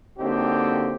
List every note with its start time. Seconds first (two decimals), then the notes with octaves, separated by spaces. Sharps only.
0.18 D3 F#3 A#3 C4 D#4 G4